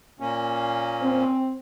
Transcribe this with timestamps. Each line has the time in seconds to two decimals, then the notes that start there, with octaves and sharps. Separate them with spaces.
0.20 A#2 A#3 C#4
1.01 C4